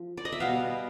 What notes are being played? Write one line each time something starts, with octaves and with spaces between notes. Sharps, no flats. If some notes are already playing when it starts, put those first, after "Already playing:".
Already playing: F3
D5
D#5
E5
B2 G3 B3 F5